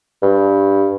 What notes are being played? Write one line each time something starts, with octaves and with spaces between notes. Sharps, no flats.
G2